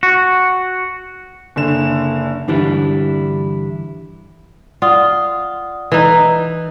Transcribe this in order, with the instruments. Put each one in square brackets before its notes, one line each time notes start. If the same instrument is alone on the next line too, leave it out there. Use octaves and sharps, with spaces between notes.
[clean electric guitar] F#4
[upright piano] F#1 D3 E7
[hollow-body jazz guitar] G2 D3 E3 G3 D4 E4
[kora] F4 [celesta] D5 F#5 D#6
[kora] E3 D#4